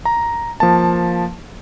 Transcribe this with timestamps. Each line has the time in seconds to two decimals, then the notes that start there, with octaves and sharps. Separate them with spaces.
0.05 A#5
0.60 F3 A#3 A5